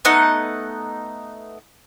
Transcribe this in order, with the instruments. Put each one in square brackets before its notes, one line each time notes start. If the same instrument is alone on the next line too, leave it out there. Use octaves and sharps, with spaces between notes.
[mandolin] A3 B3 D#4 F#5